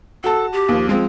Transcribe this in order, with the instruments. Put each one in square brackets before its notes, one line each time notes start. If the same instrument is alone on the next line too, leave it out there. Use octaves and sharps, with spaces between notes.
[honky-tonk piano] F#4 A5 [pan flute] A4
[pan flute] G4
[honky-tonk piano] D#2 F3
[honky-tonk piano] F3 G#3 [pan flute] C4